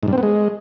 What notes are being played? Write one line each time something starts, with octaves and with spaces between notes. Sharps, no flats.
G#2
G2
C4
B3
G#3